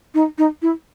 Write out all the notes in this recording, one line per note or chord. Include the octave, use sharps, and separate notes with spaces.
D#4
D#4
E4